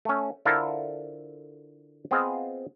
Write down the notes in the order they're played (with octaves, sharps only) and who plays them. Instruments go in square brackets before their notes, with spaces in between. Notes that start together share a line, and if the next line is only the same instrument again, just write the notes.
[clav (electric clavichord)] A3 C#4
D3 E4 F4 A4 A#4 C5
B3 C4 F4 G#4 D#5 F5